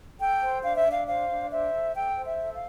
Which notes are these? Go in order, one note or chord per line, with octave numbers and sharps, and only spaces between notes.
A4 G5
C5
D4 F5
E5
D4 F5
C5 F5
D4
C5 E5
A4
A4 G5
C5
E5
A4
F5